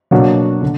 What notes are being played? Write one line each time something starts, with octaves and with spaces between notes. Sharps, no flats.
B2 F#3 A#3 D4 F#4
D3